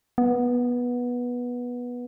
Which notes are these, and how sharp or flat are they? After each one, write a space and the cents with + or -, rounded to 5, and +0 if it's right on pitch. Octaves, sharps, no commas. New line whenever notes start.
B3 -15